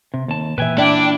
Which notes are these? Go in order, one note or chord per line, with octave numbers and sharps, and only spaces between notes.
C3
D#2 B3 A5
A#2 E3 B4 E5 G5 G#5
D4 E4 D5 G5